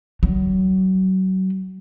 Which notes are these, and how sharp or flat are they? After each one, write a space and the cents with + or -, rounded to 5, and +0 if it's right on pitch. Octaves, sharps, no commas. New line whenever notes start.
F#3 +30